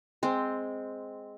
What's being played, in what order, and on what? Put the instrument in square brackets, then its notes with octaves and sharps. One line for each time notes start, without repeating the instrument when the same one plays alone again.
[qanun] G#3 C4